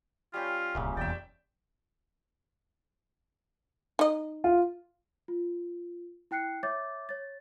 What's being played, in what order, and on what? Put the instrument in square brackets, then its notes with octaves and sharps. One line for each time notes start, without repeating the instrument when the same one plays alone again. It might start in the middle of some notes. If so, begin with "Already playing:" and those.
[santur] G3 C#4 G5 [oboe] F4
[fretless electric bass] D1 C2 [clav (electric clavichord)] F#2 A#2 C#3
[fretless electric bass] F1 B1 E2 [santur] D5 E5 [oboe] G5
[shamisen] D#4 D#5
[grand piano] F4
[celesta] F4
E4 G5 F#6 C7 C#7
C#5 E5 D6 G6 A6
C#5 A6